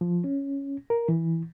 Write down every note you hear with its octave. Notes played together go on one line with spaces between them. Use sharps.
F3
C#4
A#4
E3